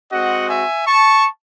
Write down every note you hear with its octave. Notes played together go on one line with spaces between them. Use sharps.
G#3 C4 F#4 D#5 F#5
E5 G#5
A5 C#6